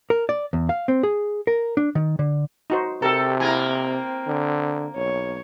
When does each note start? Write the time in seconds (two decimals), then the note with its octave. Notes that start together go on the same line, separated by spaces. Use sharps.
0.10 A#4
0.29 D5
0.53 E2
0.69 F5
0.88 C4
1.03 G#4
1.47 A#4
1.77 D4
1.95 D#3
2.19 D3
2.70 D#4 F#4 C5
3.02 C3 G4 A4 A#4 A5
3.40 A#3 E4 A#4 G#5
3.71 C4
4.27 D3
4.96 B1 C#5